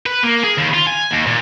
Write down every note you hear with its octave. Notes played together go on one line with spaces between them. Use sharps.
B4
A#3
G#4
D#2
F4
G#5
D#2
A#2